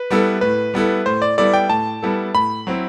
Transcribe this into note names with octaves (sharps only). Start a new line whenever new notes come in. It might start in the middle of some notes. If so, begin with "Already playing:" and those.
Already playing: B4
G3 B3 E4 A4
A2 B4
G3 B3 E4 A4
A2 C5
D5
G3 B3 E4 A4 D5
G5
A2 A5
G3 B3 E4 A4
A2 B5
F#3 C4 E4